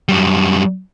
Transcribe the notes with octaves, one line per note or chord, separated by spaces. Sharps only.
F#2 G3